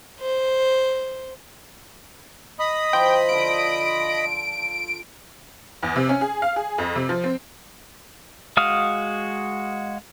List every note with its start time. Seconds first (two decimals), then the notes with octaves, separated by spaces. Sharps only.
0.20 C5
2.59 D#5 B5 D#6
2.93 F3 C5 G5
3.29 D3 F4 D7
5.83 E2
5.96 C3
6.09 C#4
6.21 G#4
6.42 F5
6.56 G#4
6.78 F2
6.96 C3
7.09 F3
7.24 C4
8.57 G#3 F#4 F5 D#6 F6